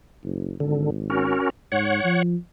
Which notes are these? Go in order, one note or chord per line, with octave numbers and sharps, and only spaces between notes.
F#1
G#1 D3
C#4 F#4 A#4
G#2 C#5 F#5
F3